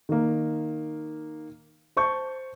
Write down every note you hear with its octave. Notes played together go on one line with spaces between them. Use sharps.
D#3 A#3
C5 A5 C#6 G6